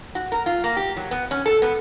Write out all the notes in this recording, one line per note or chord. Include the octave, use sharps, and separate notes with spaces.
F#4
A#4
F4
A#3
G4
F#3
B3
C#4
A4
B3